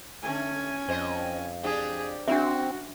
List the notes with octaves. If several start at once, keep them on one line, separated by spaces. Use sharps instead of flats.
D3 A3 C#4 G#5
F2 C4 C5 D#5
C4 D4 G4 G#4
F#2 C4 D4 F#4 E5